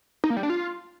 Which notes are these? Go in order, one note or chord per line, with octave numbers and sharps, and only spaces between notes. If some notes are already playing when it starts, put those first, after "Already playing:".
D#4
A#3
G3
D4
F4